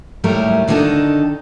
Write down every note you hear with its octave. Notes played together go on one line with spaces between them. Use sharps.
D#2 A2 F#3 G3 A3 A#4
D3 D#3 B3 D4 D#4 A4